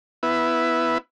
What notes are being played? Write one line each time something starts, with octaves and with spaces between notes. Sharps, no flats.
B3 E4